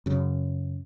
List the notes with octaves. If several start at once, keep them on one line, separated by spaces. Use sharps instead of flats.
F#2 C#3